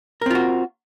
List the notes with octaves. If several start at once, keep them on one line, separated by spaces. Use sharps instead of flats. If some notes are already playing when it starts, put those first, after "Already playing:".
C4 F4 F#4 A#4